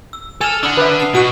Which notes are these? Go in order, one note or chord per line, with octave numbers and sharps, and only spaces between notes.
E6
A4 G#5 F6 E7 F7
D4 F#5 B5 D#6 E6
B4 E5
A5 D#6 C7
B2 F#4 D#7 F#7